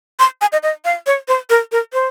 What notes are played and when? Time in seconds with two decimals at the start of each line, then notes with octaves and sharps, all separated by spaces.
0.19 C6
0.41 G#5
0.53 D#5
0.63 D#5
0.85 F5
1.07 C#5
1.28 C5
1.50 A#4
1.72 A#4
1.93 C5